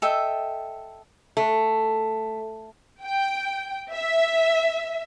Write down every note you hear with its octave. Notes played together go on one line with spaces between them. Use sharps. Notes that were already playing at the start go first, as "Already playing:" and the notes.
A4 D#5 E5 G5
A3
G5
E5